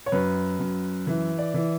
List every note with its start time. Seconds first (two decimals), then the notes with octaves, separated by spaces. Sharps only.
0.06 C#5
0.12 F#2 B4
0.59 F#2
1.07 E3
1.38 D5
1.54 E3